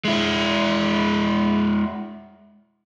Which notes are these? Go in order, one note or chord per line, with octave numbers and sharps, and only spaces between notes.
G#3 E4